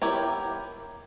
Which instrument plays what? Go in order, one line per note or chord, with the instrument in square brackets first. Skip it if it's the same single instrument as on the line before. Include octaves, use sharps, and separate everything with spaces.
[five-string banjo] B3 E4 G4 A#4 C#5